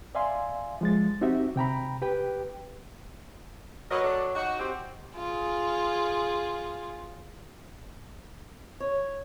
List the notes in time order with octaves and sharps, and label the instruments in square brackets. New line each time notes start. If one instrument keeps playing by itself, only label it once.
[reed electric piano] D5 E5 F5 G#5 C6
F3 G#3 A6
C4 D#4 F#4 G4 E5
C3 G5 A#5 B5
G4 B4 G5
[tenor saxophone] F#3 [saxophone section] A#4 B4 D#5
[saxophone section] D4 A4
[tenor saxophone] D#4 [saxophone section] F#4
[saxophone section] C4 G4
[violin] F4 G#4
[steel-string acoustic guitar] C#5